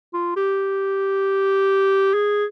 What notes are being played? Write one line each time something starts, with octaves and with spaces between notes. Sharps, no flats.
F4
G4
G#4